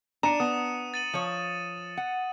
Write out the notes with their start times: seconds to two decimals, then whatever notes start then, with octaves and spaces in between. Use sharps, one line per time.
0.23 D4 A#5 C#7 D#7 E7
0.40 B3 D#6
0.94 A6 D#7 F#7
1.14 F3 C#5
1.97 F#5